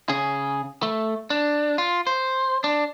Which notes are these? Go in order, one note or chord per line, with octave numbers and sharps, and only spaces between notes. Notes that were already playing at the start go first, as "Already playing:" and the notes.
C#3 G#4
A3
D4
F4
C5
D4